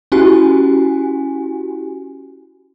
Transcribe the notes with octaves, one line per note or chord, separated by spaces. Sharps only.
C#4 E4 F#4 G4 G#5